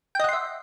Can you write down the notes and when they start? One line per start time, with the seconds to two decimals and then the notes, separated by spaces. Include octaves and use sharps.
0.15 G5
0.20 D#5
0.24 F#5
0.29 C6
0.33 E5